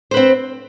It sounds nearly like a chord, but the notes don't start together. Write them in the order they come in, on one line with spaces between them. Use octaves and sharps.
C5 B4 C4